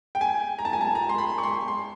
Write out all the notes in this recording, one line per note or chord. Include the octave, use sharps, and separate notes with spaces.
G5
G#5
A#5
A5
G#5
A5
A#5
C6
B5
C#6
C6
C6